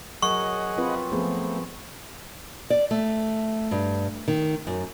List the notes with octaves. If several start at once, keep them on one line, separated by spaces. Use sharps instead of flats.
F#3 G#4 A#4 D#5 F#5 C#6
C4 F4 B4
F3 A3 B3 C4 G#4
D5
A3
G2
D#3
F#2